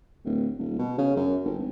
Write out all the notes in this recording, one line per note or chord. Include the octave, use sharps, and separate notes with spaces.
D1
D#1
B2
C#3
F#2
G1
G#1